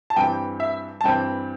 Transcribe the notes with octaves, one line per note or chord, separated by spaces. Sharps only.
A5
G2 E3 G3 C4 G5
E5
A5
G2 E3 G3 C4 G5